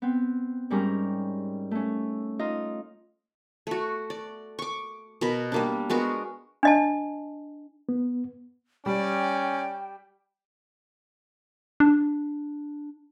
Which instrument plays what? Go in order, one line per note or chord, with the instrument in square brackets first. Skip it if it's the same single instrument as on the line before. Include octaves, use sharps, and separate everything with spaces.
[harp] B3 C4
G#2 G3 C#4 A#4
A3 C#4
D#4 F4 D#5
[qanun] A3 F#4
D5
C#6 D6
B2 A#4 B5
G3 A#3 D4
G#3 B3 F#4 A#4
[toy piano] D4 D#5 A5
[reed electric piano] B3
[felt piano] G3 [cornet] C#4 [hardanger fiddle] D5 [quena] G5
[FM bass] D4